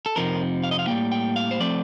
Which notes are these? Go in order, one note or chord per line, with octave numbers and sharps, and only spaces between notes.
A4
F2 C3 F3 C4 D#4 A#4
F5
D#5
F5
A2 G3 A#3 G5
G5
F5
C5
F3 A3 C4 D5